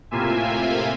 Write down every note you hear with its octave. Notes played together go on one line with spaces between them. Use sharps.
A2 C3 A#3 F4 E5 G#5